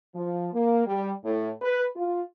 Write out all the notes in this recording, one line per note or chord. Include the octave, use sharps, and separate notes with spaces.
F3
A#3
G3
A2
B4
F4